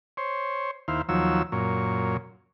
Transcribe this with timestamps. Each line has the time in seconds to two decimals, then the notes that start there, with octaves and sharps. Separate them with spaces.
0.17 C5 C#5
0.88 D#2 E4 C5 F5
1.09 D#2 F3 F#3 C#5 E6
1.52 F#2 A#2 C#5